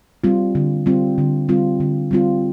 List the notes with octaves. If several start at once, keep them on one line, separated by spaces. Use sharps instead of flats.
G3 C4 F4
D3
G3 C4 F4
D3
G3 C4 F4
D3
G3 C4 F4